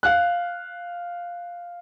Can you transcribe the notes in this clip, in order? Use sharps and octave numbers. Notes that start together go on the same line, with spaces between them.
F5 F#6